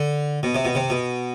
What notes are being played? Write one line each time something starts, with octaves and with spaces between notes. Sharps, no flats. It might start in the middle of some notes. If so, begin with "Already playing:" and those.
Already playing: D3
B2
C3
B2
C3
B2